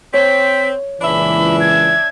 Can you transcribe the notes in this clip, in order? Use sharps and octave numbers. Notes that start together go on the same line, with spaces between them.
C4 C#5 B6
C#2 A#2 E3 D4 E5 B5
G#6